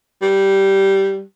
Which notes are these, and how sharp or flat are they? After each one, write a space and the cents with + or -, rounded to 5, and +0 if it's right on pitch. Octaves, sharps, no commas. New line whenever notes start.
G3 -10